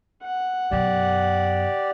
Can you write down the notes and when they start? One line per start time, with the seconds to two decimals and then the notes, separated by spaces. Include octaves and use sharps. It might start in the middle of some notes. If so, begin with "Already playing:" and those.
0.24 F#5
0.71 F#2 B2 G4 D5